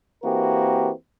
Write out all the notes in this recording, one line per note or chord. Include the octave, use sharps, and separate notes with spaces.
E3 A#3 C4 F#4 G4 A#4